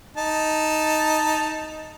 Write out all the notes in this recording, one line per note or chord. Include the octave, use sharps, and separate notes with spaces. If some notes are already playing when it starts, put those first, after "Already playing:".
D#4 A5